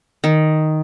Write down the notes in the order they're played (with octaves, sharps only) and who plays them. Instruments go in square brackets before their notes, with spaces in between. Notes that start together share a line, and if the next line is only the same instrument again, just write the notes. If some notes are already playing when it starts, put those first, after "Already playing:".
[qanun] D#3